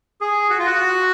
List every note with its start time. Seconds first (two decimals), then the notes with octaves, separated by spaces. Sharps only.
0.21 G#4
0.50 F#4
0.59 F4
0.66 F#4